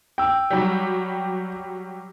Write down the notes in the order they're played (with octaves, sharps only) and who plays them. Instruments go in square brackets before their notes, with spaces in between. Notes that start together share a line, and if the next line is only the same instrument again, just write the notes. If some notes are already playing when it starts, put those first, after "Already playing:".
[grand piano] G5 E6
[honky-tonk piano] F#3 G3